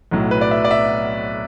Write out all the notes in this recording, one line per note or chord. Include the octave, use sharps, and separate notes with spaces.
B1 A2 F#3
B4
D5
E5
D5
E5